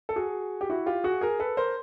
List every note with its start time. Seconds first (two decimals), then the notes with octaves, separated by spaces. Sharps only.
0.09 A4
0.16 F#4 G#4
0.61 G4
0.70 E4 F#4
0.86 F4 G4
1.04 F#4 G#4
1.21 G#4 A#4
1.40 A4 B4
1.57 A#4 C5